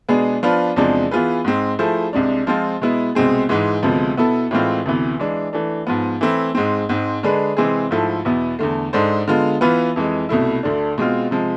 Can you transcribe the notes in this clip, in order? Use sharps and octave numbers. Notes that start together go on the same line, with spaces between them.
B2 G#3 B3 D4 G#4
F3 B3 D4 F4 B4
E2 C3 F3 G#3 D4
E3 B3 F4 G#4 B4
G#2 G#3 C4
F3 A3 E4 G#4 C5
C2 C3 G#3 D4
F3 G#3 C4 F4
B2 G#3 B3 E4
C2 B2 G#3 C4 G#4
G#2 E3 G#3
D2 C3 F3 G#3 B3
B2 B3 E4 A4
A2 E3 G#3 C4 F4
D2 C3 E3 B3
E3 G#3 D4
E3 A3 D4
G#2 F3 B3
E3 A3 C4 E4
G#2 G#3 C4
G#2 G#3 C4
D3 G#3 D4 G#4 B4
C3 E3 G#3 C4 G#4
G#2 F3 A3 E4 A4
E2 B2 B3 E4
E2 D3 A3
G#2 G#3 D4 A4 C5
D3 G#3 B3 F4
E3 B3 F4 B4
F2 E3 G#3
C2 B2 A3 E4
D2 D3 A3 D4
B2 G#3 C4 F4
C3 F3 G#3